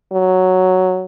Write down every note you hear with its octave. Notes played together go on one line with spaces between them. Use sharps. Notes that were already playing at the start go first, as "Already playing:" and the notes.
F#3